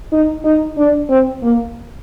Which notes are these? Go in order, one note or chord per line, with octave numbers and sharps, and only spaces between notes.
D#4
D#4
D4
C4
A#3